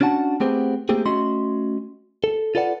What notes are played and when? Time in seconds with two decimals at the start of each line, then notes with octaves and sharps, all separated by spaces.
0.01 C#4 D4 F#4 F#5 A5
0.40 A3 B3 C4 G4 G#4 C5
0.89 A3 A#3 C4 G4 G#4
1.06 A3 C#4 F#4 D#5 C6
2.24 A4
2.55 F4 A4 B4 D5 F#5